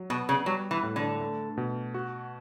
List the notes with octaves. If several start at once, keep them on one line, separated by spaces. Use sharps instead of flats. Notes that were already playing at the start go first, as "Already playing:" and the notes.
Already playing: F#3
B2 B3
C#3
F#3 G3
E3
A2
D3
A3
B2
F#4